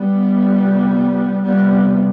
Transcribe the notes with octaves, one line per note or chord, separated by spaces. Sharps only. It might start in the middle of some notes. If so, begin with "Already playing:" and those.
Already playing: G3 B3
F2 C3
F2 C3 G3 B3